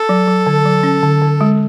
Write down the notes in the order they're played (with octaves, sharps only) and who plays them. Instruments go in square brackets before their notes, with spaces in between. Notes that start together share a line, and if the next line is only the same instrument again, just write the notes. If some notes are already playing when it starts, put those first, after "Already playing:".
Already playing: [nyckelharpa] A4
[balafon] F#3
F#3
D3
F#3
C#4
D3
D3
G#3